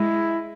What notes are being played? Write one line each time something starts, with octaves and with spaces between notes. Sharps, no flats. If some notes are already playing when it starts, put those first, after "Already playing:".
Already playing: G#3 E4